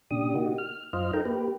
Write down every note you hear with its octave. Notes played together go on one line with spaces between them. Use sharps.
A#2 C#3 D4 G4 D#6
A#3 D#4 F#4 G4
F6
F#2 F4 C5 D#5 F6
D#4 A4 A#4 G5 A#5
A#3 G4 B4